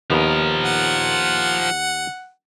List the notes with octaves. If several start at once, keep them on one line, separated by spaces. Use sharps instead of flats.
D#2 F3 B3 A#4
F#5